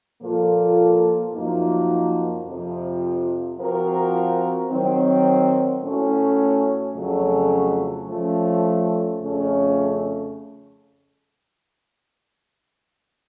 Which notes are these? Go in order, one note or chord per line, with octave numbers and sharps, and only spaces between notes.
A#2 F3 A#3 F4 A4
F#2 F3 A#3 D#4 F#4
F2 C3 F3
F3 C4 F#4 A#4
D#3 F#3 C4
A2 A3 C#4 F#4
F2 C#3 F#3 A3 C#4
F3 A3 C#4
F2 C#3 A3 C#4